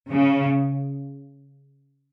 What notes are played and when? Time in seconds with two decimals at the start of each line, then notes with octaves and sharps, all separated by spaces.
0.10 C#3